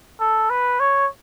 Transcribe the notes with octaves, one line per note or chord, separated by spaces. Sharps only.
A4
B4
C#5